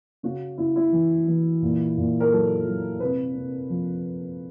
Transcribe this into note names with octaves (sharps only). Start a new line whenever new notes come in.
C#3 F#4
C#3 E4
E4
E3
E3
A#2
A#2
A#4
F#3 A4
F#3
C3 B4
C3
F3